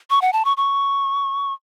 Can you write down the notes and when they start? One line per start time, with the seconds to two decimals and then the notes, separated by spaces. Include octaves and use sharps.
0.10 C#6
0.22 F#5
0.33 A5
0.45 C#6
0.57 C#6